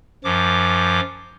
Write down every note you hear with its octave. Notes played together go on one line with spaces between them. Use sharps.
F#2 F3 D6